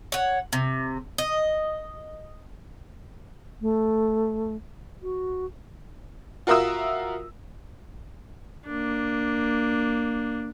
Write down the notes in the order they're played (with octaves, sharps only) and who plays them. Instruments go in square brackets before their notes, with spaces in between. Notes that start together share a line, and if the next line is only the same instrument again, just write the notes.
[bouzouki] C#5 F#5
C3
D#5
[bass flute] A3
F#4
[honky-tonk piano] F4 F#4 A#4 E5 D#6 E6
[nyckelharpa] A#3 D4